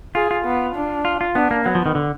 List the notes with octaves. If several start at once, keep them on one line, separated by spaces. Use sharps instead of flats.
F4 G#4
F4
B3
D4
F4
F4
B3 D4
A#3
F#3 B3
F3
D#3
D3